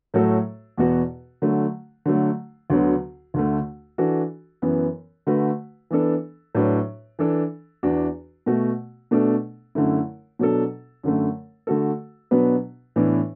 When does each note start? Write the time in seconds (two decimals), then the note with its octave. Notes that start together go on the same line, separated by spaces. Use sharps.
0.14 A2 F#3 A3 F#4 A4
0.77 E2 B2 B3 F#4
1.42 D3 F#3 A3
2.06 D3 F#3 A3
2.70 D2 D3 F#3 B3
3.34 D2 D3 A3
3.98 E3 D4 F#4 A4
4.62 F#2 E3 B3
5.27 D3 A3 F#4 B4
5.90 E3 B3 D4 A4
6.55 A2 F#3 D4 B4
7.19 E3 D4 A4
7.83 E2 E3 D4 F#4
8.46 B2 A3 F#4
9.11 B2 A3 D4 A4
9.75 F#2 D3 A3 E4
10.39 B2 F#3 D4 A4
11.04 F#2 D3 A3
11.67 D3 A3 F#4 A4
12.31 B2 F#3 B3 D4 B4
12.96 A2 E3 B3 D4